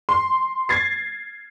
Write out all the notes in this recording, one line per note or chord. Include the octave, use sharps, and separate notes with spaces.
C6
G#6 A6 C7